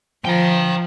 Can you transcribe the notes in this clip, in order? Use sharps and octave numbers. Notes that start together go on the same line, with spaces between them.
F3 G5 A#5